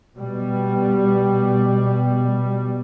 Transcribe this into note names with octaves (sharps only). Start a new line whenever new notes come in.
B2 G3